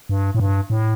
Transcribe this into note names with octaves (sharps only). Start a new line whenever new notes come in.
G2
A2
G2
A2